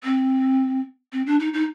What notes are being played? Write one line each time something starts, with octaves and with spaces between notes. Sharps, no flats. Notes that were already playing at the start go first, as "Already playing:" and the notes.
C4
C4
D4
D#4
D#4